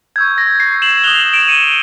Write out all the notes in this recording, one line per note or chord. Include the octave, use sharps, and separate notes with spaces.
C#6 E6 G6 G#6
A#6
C7
E7 F#7
D#6 F#6 F7 G7
E7 F#7
D7 E7
C#7 D#7